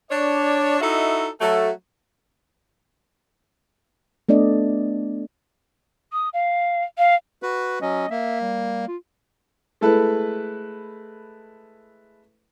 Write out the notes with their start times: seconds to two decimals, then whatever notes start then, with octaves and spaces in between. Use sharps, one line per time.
0.11 D4 C#5 D5
0.80 D#4 E4 F#4 A4 D#5 E5
1.41 F#3 A3 A4
4.29 A3 B3 D4 D5 D#5
6.13 D#6
6.33 F5
6.98 F5
7.43 F#4 B4
7.82 F#3 C#4 D#5
8.10 A#3 E5
8.41 G3
8.88 F4
9.81 G#3 A3 E4 A4 B4